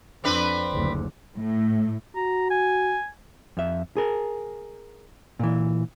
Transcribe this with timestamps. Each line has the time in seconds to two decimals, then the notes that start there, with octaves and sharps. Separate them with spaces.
0.24 F2 C4 D4 B4
0.72 F#1 D2
1.36 A2
2.16 F#4 A#5
2.51 G#5
3.57 F2 E5
3.97 G#4 A#4
5.39 A#2 E3